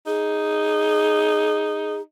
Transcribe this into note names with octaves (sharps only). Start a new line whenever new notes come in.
D#4 G#4